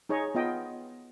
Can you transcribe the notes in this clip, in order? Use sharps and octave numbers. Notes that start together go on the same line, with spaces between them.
D#4 G#4 C#5 D#5
B3 F4 D#5 G5